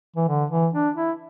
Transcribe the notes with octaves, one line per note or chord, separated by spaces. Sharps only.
E3
D3
E3
D4
E4